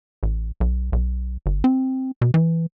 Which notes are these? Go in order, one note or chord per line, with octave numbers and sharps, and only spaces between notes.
A1
B1
B1
G1
C4
B2
E3